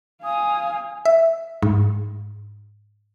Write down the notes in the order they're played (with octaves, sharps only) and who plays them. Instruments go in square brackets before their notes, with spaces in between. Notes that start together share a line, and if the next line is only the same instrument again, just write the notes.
[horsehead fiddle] F5 G#5 [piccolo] D#6
[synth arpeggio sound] E5
G#2